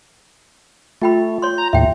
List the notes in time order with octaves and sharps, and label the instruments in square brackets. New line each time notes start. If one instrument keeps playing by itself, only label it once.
[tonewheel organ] A3 [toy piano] F4 G5 B5
[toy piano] C#5 C6
[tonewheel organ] A#5
[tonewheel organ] D#2 A2 [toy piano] E5 G5